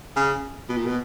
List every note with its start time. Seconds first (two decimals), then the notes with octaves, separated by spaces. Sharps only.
0.16 C#3
0.69 B2
0.77 A#2
0.86 B2